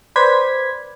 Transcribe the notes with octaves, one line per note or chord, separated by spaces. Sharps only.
B4 C5 D5 G#6 B6